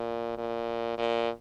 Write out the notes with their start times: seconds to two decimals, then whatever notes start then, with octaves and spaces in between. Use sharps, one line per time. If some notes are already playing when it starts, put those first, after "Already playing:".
Already playing: A#2
0.38 A#2
0.98 A#2